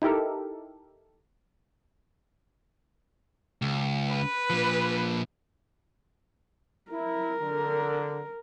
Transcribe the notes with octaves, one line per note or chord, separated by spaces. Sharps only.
D#4 E4 G4 A4 A#4
C#2
B4
A#2 F3
E4 A#4
D3